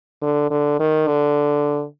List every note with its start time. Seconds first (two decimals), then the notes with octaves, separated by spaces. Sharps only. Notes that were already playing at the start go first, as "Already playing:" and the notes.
0.22 D3
0.50 D3
0.79 D#3
1.07 D3